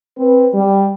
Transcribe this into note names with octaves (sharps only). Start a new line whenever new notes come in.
C4 B4
G3